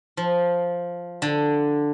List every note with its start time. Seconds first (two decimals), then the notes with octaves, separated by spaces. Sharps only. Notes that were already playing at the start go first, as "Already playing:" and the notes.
0.17 F3
1.22 D3